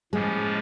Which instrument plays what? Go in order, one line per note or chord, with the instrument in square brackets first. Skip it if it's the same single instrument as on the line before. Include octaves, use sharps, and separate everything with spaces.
[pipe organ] A2 F3 A#3 C#4 [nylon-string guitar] G#3